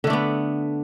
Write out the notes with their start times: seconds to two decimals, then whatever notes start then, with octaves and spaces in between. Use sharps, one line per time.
0.04 D3
0.07 A3
0.10 D4
0.13 B3